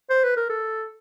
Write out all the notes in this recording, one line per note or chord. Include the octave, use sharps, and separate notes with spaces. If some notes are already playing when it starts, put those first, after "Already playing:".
C5
B4
A#4
A4